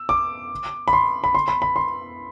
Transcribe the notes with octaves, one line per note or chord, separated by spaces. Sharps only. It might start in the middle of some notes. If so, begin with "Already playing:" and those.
Already playing: E6
D6
B5
C6
B5
C6
B5
B5
C6